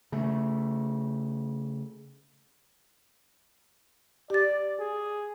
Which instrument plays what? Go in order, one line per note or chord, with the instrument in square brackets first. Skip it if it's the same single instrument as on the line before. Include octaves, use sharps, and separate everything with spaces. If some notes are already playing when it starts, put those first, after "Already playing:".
[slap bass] C#3 A3
[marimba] G4 A6 [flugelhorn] D5
[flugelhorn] G#4